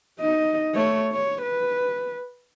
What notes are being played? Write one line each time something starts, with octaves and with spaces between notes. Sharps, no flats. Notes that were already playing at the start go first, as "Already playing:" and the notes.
D#4 D#5
A3 C#5
C#5
B4